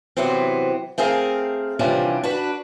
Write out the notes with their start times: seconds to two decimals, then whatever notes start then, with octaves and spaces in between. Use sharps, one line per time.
0.17 C3 E3 F#3 B3 C4
0.98 A3 C4 G#4 A#4 F5
1.79 C3 E3 F3 G3 C#4 D4
2.24 D4 F#4 B4